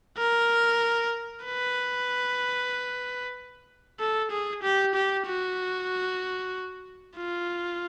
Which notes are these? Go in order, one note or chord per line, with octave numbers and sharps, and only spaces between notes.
A#4
B4
A4
G#4
G4
G4
F#4
F4